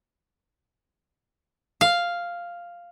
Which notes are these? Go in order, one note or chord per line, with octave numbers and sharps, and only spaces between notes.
F5